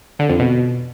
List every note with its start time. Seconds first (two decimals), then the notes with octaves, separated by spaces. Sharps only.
0.19 D3
0.30 F2
0.40 B2